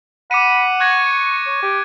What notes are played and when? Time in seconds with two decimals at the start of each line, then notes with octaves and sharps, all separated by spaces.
0.31 F#5 B5 D6 C#7 D#7
0.80 C#6 F#6 G#6 A#6
1.46 C#5
1.63 G4